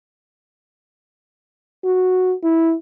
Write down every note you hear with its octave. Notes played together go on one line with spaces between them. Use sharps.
F#4
E4